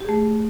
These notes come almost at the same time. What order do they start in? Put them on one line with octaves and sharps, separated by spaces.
G4 G#4 A3